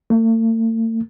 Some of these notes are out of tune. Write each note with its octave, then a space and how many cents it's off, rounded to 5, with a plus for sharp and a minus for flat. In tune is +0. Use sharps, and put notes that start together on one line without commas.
A3 +45